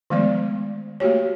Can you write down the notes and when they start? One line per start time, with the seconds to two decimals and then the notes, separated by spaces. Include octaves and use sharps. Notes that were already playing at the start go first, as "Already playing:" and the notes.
0.10 D#3 F3 G#3 A3 B3 D5
1.00 A3 A#3 F#4 G4 C#5